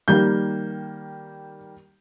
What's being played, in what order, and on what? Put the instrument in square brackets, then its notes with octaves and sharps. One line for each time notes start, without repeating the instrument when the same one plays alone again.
[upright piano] D#3 G3 A#3 G6